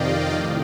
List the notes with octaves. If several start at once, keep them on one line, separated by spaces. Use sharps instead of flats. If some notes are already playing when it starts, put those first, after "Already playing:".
Already playing: F2 C3 D#3 D5 D#5 F5 G5
A2